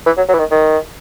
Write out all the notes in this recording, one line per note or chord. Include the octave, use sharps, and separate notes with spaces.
E3
F#3
F#3
E3
D#3
D#3